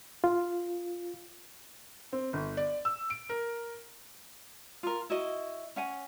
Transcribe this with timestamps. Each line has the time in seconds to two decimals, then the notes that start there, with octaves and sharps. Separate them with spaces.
0.24 F4
2.13 C4
2.33 G1
2.57 D5
2.85 E6
3.10 D7
3.29 A#4
4.83 F4 A#4
5.10 E4 F#4 D#5
5.76 C#4 F#5 G#5